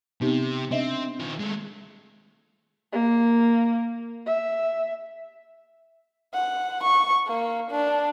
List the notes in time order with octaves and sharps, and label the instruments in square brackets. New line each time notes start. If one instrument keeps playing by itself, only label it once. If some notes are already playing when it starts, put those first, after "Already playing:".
[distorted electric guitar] C3 [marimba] B3 D#4 G4
[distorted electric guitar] C4 [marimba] D4 D#5 E5
[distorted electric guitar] D#3 F4
G#3 A3
[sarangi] A#3
E5
[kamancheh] F#5
C#6
A#3
D4